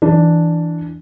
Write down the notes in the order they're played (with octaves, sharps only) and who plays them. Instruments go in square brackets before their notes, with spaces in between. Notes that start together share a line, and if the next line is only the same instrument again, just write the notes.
[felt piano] E3 D4